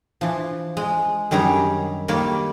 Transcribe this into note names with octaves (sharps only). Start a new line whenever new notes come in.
E3 F3
G#3
F#2 D#3 G3 G#4 A#5
D#3 G3 A#3 C#5 D5